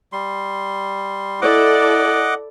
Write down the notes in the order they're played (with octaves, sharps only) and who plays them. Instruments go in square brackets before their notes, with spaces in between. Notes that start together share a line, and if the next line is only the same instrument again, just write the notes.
[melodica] G3 C6
[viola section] E4 A4 D5 [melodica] D#5 F#5 D6